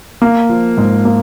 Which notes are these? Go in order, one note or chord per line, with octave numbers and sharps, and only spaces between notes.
A#3
F3
G#2
A#3